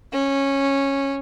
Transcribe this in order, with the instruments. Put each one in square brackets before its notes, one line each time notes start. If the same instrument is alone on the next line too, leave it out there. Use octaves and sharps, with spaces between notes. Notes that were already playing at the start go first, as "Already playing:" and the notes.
[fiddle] C#4